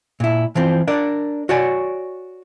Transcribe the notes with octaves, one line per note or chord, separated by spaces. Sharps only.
A#2 E4
E3 F3 C4
D4 A#4 D5
F#4 C#5 D5 G#5